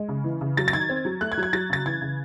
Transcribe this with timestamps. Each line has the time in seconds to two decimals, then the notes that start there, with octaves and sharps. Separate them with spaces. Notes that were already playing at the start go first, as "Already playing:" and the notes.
Already playing: G#3
0.09 C#3
0.24 E3
0.41 C#3
0.57 F#3 A6
0.68 A6
0.73 D#3 G#6
0.89 C4
1.05 F#3
1.21 A3 F#6
1.32 G#6
1.37 F#3
1.43 G#6
1.53 F#3 A6
1.70 C#3 A6
1.86 E3 G#6
2.02 C#3